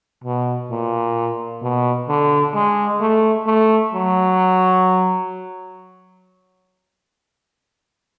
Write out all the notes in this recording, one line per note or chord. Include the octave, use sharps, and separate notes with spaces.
B2
A#2
B2
D3
G#3
A3
A3
F#3